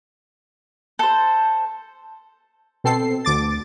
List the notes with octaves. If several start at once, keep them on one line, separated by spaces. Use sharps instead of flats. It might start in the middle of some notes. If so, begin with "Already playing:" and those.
A4 C5
B2 C4 A4 C7
D2 D6 A6